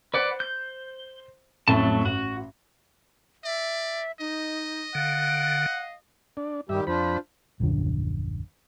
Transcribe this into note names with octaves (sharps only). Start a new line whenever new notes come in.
B4 C5 D5 F#5
G6
A1 F2 A2 F#3 A3 A5
A1 F#4
D5 E5
D#4 D#5
D3 F5 F#5
D4
G2 D#3 G3 G4 E5
F2 D4 F4 C5 B5
D#1 A#1 F#2 D3